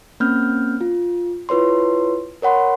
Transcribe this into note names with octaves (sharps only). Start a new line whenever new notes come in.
A#3 C4 C#4 F6 G6
F4
E4 F4 B4 C#5 C6
A#4 C#5 F#5 B5 C6